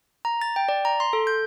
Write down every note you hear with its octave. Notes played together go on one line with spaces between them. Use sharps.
A#5
A6
G5
D5
A#5
C6
A4
G6